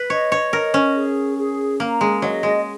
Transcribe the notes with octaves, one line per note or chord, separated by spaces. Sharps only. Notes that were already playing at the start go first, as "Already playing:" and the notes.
Already playing: B4
C#5 D#5
C#5
A#4 D#5
C#4
G#4
G#4
A#3 A#5
G#3
F#3 D#5
G#3